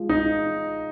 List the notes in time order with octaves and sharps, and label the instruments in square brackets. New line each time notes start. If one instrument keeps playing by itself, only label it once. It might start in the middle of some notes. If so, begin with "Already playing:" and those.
Already playing: [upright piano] F3 G#3
[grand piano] D#4